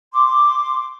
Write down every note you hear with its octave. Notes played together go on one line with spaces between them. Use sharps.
C6 D6